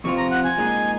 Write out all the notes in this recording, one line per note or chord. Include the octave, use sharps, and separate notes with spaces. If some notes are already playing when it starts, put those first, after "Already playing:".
F2 C3 F3 C4 F4 C#6
A#5
F#5
G#5
A#2 G#3 D#4 G#4